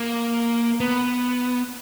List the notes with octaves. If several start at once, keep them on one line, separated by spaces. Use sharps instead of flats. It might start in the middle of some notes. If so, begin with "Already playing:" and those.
Already playing: A#3
B3